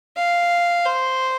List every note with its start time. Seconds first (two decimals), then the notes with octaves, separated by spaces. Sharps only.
0.17 F5
0.85 C5